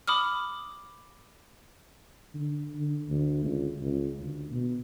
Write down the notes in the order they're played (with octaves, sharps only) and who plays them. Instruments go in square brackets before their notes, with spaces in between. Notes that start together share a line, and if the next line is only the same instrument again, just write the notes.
[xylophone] B5 D6 D#6 F6
[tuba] D3
D3
D2
C#2
C#2
D2
B2